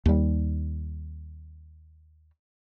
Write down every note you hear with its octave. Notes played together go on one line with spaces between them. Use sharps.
D#2 G3